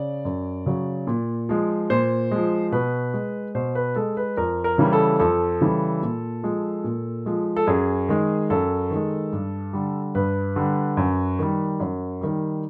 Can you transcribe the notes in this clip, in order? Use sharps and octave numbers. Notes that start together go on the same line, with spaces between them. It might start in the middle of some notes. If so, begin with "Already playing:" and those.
Already playing: C#3 D5
F#2
C#3 F#3
A#2
F3 G#3
A#2 C5
F3 G#3
B2 B4
G#3
B2 C5
B4
G#3 A4
B4
F2 A#4
A#4
C#3 E3 G3
A4
F2 A4
C#3 E3 G3
A#2
F3 G#3
A#2
F3 G#3
A4
F#2 G#4
D#3 G#3
F#2 A4
D#3
G#3
G2
D3 G3
G2 B4
D3 G3
F#2
D#3 G3
F#2
D#3 G3